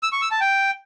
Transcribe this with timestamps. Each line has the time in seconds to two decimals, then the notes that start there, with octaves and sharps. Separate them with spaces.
0.03 E6
0.12 C#6
0.22 E6
0.31 A5
0.41 G5